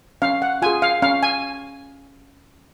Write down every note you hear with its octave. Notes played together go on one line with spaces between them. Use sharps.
C#4 F5
F#5
F4 G#4 G#5
F5
C#4 F5
G#5